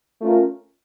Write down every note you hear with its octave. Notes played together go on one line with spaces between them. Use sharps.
A3 C#4 F4 A#4